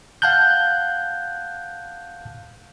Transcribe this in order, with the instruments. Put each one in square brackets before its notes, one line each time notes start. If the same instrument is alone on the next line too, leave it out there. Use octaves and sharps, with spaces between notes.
[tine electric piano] F5 F#5 A5 F#6 G6